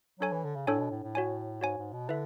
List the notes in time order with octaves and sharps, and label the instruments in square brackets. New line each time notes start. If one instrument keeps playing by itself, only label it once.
[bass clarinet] F#3 [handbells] D4 A4 C#5 G#5
[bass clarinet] E3
D3
C#3
[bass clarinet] A2 [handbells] D4 A4 C#5 G#5
[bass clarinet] B2
A2
A2
[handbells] F#4 C#5 G#5
[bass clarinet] G#2 [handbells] F#4 C#5 G#5
[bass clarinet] G#2
B2
[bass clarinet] D3 [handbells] E4 B4 E5